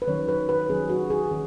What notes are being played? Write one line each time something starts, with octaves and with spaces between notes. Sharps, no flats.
B4
D#3 F#3 C#4 C#5
B4
B4
D#3 F#3 C#4 G#4
F#4
G#4
D#3 F#3 C#4